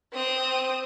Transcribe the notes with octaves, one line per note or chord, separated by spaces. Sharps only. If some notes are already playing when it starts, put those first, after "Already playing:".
C4 D#6